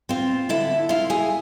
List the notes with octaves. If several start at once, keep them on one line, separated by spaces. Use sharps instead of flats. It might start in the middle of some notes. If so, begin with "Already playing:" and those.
C4 F4
D3 E4 E5
E4 F4 F5
G#4 G#5